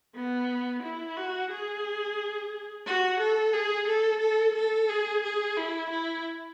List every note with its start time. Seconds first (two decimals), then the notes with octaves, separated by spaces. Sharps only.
0.15 B3
0.83 E4
1.17 F#4
1.50 G#4
2.86 F#4
3.20 A4
3.53 G#4
3.87 A4
4.21 A4
4.55 A4
4.89 G#4
5.23 G#4
5.57 E4
5.90 E4